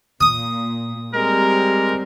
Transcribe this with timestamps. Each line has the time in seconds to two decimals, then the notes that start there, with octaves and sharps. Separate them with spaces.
0.21 A#2 D#6
1.14 G3 G#3 C4 A#4